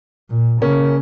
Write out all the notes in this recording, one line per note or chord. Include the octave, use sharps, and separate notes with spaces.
A#2
C#3 A#3 C#4